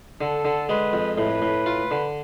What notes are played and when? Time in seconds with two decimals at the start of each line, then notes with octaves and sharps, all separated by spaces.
0.20 D3 A4
0.45 D3
0.69 G#3 B4
0.93 F2
1.17 A2 B4
1.42 A2
1.66 F4
1.91 D3